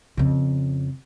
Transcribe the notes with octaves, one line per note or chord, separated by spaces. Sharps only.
F2 C#3